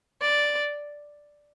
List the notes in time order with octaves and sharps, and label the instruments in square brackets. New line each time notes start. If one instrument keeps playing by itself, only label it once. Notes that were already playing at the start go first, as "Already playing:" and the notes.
[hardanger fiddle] D5